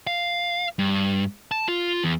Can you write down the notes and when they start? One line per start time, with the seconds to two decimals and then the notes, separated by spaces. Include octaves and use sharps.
0.07 F5
0.79 G2
1.51 A5
1.68 F4
2.04 E2